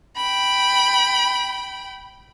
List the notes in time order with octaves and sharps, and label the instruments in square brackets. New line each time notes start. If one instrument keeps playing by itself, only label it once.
[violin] G5 B5